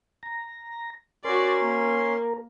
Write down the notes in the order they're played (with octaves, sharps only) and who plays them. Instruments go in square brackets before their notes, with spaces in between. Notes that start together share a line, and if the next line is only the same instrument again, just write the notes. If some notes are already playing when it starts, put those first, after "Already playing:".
[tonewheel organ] A#5
[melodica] C#4 C6 [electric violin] F#4 D5 [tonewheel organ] A#4
[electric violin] A#3